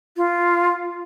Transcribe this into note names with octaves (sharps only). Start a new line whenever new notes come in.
F4